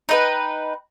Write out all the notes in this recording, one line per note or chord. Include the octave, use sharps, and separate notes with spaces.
D#4 B4 G5